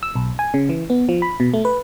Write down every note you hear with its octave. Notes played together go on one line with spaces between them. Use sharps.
E6
B1
G#5
C#3
E3
B3
F3
B5
B2
A3
B4